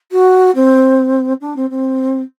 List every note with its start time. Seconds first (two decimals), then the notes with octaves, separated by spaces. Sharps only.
0.12 F#4
0.55 C4
1.41 D4
1.56 C4
1.70 C4